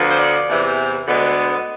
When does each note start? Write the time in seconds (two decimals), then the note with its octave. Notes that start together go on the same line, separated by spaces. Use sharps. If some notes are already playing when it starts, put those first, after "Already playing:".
Already playing: D2 D3 F3 B3
0.10 C5
0.18 D5
0.48 E2 C3 E3
1.07 D2 D3 G#3 B3